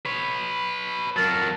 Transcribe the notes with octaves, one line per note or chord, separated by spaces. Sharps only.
B4 C#5
F2 F#3 A#4 A5